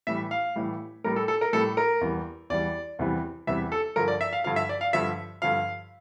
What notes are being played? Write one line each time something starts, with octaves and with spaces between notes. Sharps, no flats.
A2 E3 G3 E5
F5
A2 E3 G3
A2 G3 A#4
A4
A4
A#4
A2 G3 A4
A#4
E2 E3 G3
E2 E3 G3 D5
E2 C3 E3 G3
E2 C3 E3 G3 E5
A4
G2 D3 F3 A#4
D5
E5
F5
G2 D3 F3 F5
E5
D5
F5
G2 D3 F3 E5
G2 D3 F3 F5